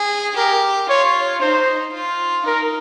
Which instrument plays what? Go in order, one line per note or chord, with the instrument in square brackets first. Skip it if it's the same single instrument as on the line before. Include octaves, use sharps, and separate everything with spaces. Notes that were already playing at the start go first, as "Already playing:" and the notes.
Already playing: [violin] G#4
[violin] G4 [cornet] A#4
[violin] F4 [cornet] C#5
[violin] D#4 [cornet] C5
[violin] F4
[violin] D#4 [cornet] A#4